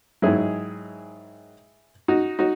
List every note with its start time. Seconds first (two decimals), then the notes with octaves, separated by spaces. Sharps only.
0.22 G#2 D#3 F#3 E4 G#4
2.08 D#4 F#4
2.39 D#4 F#4